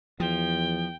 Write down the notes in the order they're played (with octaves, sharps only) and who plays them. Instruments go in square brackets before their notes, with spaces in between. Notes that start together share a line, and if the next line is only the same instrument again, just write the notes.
[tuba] E2 [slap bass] F3 [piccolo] G5